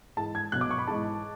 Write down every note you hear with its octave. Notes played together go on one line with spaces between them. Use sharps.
G#2 E3 G#3 A5
G#6
B2 F#3 F#6
D6
C#6
B5
G#2 E3 G#3 A5